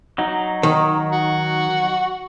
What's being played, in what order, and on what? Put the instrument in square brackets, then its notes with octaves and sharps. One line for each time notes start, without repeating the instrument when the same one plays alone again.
[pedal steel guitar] F#3 D#4
[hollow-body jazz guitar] D#3
[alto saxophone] F#4